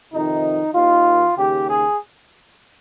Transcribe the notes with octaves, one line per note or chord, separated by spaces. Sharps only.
F2 C3 D#3 D#4
D#2 D#3 F4
D#2 C#3 G4
G#4